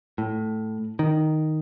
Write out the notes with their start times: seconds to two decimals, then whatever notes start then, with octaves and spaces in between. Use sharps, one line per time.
0.18 A2
0.99 D#3